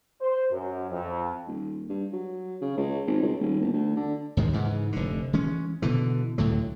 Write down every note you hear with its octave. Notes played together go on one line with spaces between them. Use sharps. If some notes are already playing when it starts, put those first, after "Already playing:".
C5
F#2
F2
D#1
G2
F#3
C#3
C#2
G#1
C#2
D#1
G1
D2
D3
D#2 G#2 C3 G#3
G#2 C#3 E3
F1 D3
E3 G#3 C#4
B2 D3 E3
C#2 A2 D3 F#3